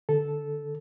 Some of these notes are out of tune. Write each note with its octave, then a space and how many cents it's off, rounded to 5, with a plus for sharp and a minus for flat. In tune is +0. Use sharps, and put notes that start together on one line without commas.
D3 +0 A4 -10